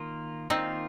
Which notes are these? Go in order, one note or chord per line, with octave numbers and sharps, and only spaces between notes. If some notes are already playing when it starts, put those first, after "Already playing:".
Already playing: D#3 A#3 F4
D#3 A#3 C4 D#4 F4